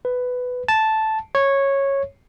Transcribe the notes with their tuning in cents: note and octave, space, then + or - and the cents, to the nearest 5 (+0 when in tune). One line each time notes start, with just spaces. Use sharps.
B4 +10
A5 -5
C#5 -10